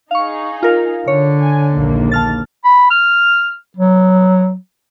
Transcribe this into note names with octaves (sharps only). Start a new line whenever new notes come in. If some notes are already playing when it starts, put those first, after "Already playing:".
D#4 G#4 F5 C#6
F4 A#4 F5
D3 C#5
G#5
A#1 D#2 A#3
A5 F6 A6
B5
F6
F#3